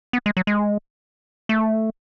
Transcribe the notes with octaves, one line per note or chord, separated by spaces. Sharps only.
B3
G#3
F#3
G#3
A3